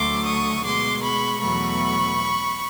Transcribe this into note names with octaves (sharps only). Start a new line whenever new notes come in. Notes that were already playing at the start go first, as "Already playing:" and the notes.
Already playing: D2 D3 F#3 A3 C6 D6
C#6 D#6
B2 G#3 C6 D6
B5 C#6
E2 B2 F#3 A3 B5 C#6